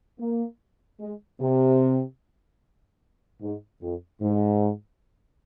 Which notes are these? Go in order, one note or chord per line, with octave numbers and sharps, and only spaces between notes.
A#3
G#3
C3
G#2
F2
G#2